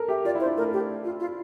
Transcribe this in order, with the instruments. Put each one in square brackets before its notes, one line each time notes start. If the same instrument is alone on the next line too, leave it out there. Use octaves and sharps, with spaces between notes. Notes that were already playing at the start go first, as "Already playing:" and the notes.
Already playing: [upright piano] A4 A#4
[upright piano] G4 [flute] E5
[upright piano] F4 [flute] D5
[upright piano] E4
[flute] C5
[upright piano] D4
[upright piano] A3 [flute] A#4
[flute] G4
F4
F4